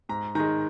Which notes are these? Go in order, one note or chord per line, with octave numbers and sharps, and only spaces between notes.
G#2 A#5
D#3 G#3 A#5